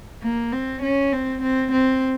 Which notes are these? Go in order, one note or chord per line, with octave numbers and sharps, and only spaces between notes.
A#3
C4
C#4
C4
C4
C4